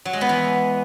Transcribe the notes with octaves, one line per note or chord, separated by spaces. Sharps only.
F#3
G#3
B3
E3